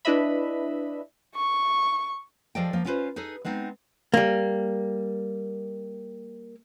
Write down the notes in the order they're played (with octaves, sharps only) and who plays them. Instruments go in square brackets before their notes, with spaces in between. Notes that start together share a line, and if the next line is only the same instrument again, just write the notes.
[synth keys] D4 E4 B4 D#5 E5 B5
[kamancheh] C#6
[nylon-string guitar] F3 G#4 A4 D5 D#5 G5
F3 A#3
B3 C#4 F4 F#4 B4 C5
D#4 G#4 A4 B4
G#3 B3 C4 D#4
[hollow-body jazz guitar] G3 A#3